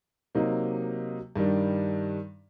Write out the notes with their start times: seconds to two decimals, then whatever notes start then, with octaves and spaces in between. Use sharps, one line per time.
0.35 C3 F#3 A#3 D#4
1.36 G2 D#3 G3 D4